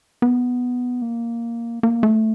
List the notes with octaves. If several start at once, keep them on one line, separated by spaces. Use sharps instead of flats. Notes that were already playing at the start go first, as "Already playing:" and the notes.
B3
A#3
A#3
A3